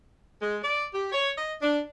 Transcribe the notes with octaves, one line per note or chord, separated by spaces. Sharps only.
G#3
D5
G4
C#5
D#5
D4